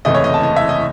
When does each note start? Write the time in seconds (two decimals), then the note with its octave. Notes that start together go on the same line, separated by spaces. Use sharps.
0.05 F#1 E2 C3 E3 A3 D#5
0.15 C#5
0.24 D#5
0.34 A5
0.43 D#5
0.56 E5
0.69 D#5